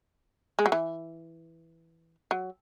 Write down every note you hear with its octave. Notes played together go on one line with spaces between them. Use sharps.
G#3
F#3
E3
F#3